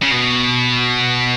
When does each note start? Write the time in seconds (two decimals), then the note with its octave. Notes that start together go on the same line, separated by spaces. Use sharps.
0.02 C#3
0.11 B2